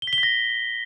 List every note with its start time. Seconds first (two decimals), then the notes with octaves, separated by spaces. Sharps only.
0.02 G7
0.07 B6
0.13 G7
0.18 B6
0.23 A#6